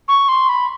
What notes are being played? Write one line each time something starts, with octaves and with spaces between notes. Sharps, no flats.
C#6
C6
B5